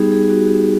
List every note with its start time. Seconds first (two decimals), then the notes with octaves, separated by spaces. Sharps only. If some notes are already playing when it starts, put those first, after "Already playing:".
Already playing: G3 B3 D#4 G4 G#4
0.12 G#4
0.30 F#4
0.47 G4